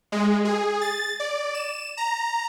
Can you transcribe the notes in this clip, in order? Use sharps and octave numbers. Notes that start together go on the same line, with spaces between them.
G#3
G#4
A6
D5
E7
A#5